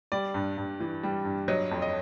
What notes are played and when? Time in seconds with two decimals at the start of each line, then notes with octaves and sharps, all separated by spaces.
0.12 G3 D5
0.34 G2
0.57 G2
0.80 E3
1.03 G3
1.25 G2
1.48 F#3 D#5
1.71 F2
1.82 D#5